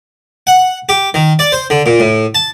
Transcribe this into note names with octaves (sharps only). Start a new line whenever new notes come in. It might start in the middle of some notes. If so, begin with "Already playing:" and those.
F#5
G4
D#3
D5
C5
D3
A#2
A2
A5